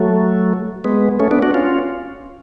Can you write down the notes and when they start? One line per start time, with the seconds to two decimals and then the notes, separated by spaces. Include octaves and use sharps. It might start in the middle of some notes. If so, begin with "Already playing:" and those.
Already playing: F#3 A3
0.84 G#3 B3
1.20 A3 C#4
1.31 B3 D4
1.42 D4 F#4
1.54 C#4 F4